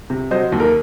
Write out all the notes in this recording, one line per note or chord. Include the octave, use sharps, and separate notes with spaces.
C3
F#3 C5 D#5
D#2
A#4